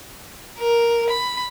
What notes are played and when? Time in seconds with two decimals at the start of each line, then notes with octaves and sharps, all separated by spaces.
0.59 A#4
1.10 B5